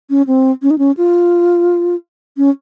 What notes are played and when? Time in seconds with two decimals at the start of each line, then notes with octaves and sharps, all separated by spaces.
0.10 C#4
0.27 C4
0.62 C#4
0.70 D#4
0.78 C#4
0.97 F4
2.37 C#4